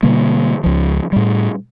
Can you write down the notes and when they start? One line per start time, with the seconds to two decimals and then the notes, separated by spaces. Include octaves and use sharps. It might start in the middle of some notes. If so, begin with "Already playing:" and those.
0.03 B2 D3 G3 A#3
0.64 C#2 F3
1.12 A2 G3